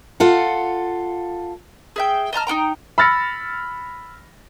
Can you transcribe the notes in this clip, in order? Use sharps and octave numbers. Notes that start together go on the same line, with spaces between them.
F4 A4 F#5
G#4 E5 G5
D#5 A5 A#5 F6
D#4 F#4 G5 A#5
B5 E6 F6 A6 A#6 C#7